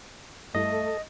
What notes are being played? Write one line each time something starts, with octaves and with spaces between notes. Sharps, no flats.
G2 G3 A3 E4 A4 D#5